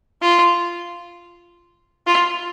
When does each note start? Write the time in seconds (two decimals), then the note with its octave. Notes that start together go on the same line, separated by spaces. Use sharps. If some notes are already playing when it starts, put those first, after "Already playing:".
0.22 F4
2.07 F4